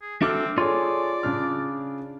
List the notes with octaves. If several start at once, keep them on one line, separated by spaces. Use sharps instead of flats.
G#4
C4 D4 F#4 A4 E5 D6 F6
F4 G#4 A4 C#5 D5 C6
C#3 D4 F6